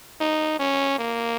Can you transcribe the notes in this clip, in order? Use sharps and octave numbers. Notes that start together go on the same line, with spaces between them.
D#4
C#4
A#3